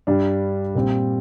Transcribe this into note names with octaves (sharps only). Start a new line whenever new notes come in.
G2 G3 D4
A#2 G3 C4